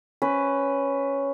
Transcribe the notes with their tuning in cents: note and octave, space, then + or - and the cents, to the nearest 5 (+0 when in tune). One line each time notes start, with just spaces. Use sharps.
C#4 +0 B4 +10